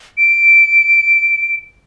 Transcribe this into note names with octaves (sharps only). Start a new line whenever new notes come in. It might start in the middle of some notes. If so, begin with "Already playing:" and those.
D7